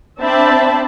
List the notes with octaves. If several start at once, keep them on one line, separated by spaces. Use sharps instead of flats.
C4 D4 C5 E5 A5 B5